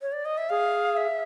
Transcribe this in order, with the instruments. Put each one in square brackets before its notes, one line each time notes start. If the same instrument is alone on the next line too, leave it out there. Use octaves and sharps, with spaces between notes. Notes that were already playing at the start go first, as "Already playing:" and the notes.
[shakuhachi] C#5
D5
D#5
E5
[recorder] G#4 [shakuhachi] F5
[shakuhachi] E5